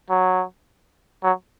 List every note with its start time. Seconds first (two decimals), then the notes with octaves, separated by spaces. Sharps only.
0.10 F#3
1.23 F#3